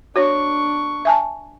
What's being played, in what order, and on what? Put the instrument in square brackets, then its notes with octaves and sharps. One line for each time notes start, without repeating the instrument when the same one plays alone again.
[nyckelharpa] D4 C#6 [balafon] F#4 C#5
[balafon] E5 G#5 A5